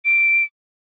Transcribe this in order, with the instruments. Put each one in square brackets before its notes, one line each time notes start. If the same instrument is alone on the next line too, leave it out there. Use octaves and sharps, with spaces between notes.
[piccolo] D7